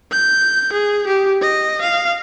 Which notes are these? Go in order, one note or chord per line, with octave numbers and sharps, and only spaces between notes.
G6
G#4
G4
D#5
F5